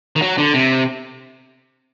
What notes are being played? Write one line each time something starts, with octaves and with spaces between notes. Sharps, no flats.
D#3
F#3
D3
C3